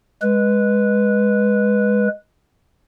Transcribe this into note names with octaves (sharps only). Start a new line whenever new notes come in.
G#3 B4